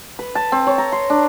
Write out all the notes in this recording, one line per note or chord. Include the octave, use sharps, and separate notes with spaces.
B4
A5
C4
C#5
A#5
C6
D4